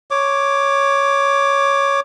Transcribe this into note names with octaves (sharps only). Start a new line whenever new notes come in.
C#5 D6